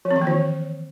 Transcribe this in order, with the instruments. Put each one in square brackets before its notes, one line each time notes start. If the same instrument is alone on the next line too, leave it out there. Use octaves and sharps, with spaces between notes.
[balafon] F3
C4
E3
A#3
D#3